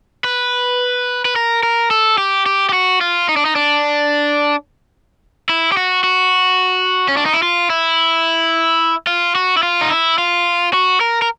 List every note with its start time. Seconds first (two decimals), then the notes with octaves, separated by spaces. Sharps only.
0.25 B4
1.25 B4
1.36 A#4
1.63 A#4
1.91 A4
2.18 G4
2.46 G4
2.69 G4
2.73 F#4
3.01 F4
3.29 D#4
3.36 D4
3.45 D#4
3.56 D4
5.49 E4
5.72 G4
5.77 F#4
6.04 F#4
7.09 C#4
7.17 D4
7.26 D#4
7.33 E4
7.42 F4
7.70 E4
9.07 F4
9.35 F#4
9.57 E4
9.63 F4
9.81 D#4
9.90 E4
10.18 F4
10.74 F#4
11.01 A#4
11.22 A#4